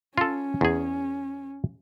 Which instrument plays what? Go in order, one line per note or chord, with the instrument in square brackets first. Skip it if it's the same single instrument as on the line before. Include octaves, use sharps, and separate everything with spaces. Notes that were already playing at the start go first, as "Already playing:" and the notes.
[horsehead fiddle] C#4 [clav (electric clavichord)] F4 A4
[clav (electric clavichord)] E2 G#4